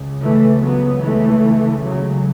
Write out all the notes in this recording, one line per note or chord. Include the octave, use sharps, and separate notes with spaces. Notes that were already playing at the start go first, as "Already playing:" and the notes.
Already playing: C#2 C#3
E3 A3
F#3 B3
E3 A3
C#3 F#3